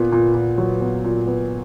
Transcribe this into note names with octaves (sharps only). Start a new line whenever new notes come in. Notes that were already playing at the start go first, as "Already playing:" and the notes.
Already playing: A#2 B3
A#2
A#2
F#3
B3
A#2
B3